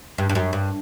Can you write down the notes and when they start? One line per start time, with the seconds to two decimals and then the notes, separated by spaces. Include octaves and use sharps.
0.18 G2
0.29 G2
0.35 F#2
0.53 G2